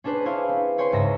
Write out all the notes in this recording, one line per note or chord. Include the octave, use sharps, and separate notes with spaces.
C#4 D4 G#4 B4 C5
E4 C5 C#5 F5 G#5 C6
C4
B4 C#5 G5 G#5 C6
C#2 G#2 E5 A#6